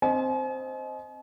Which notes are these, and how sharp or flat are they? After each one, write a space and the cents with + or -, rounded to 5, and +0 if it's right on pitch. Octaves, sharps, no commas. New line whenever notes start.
C4 +0 D#5 +0 G#5 +45